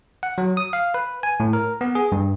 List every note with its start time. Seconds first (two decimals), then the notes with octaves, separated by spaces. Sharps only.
0.23 F#5
0.38 F#3
0.57 D#6
0.73 F5
0.94 B4
1.23 G#5
1.40 A2
1.53 A#4
1.81 B3
1.95 G#4
2.12 G2